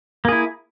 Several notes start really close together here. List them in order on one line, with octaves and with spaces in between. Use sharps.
A#3 G#4 E4